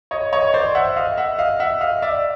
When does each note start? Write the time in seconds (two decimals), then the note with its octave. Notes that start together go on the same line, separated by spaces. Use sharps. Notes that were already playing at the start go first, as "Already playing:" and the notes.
0.11 C#5 D#5
0.33 C#5 D#5
0.54 C5 D5
0.75 E5 F#5
0.97 D#5 F5
1.18 E5 F#5
1.38 D#5 F5
1.60 E5 F#5
1.81 D#5 F5
2.02 D5 E5